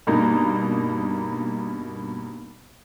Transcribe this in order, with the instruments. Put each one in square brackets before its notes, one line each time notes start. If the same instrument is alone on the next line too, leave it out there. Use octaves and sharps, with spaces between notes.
[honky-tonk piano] G2 B2 A#3 D#4